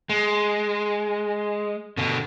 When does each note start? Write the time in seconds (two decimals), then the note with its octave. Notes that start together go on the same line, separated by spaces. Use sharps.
0.09 G#3
1.97 B2 D3